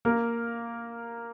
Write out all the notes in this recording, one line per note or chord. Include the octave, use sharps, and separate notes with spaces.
A#3 A#4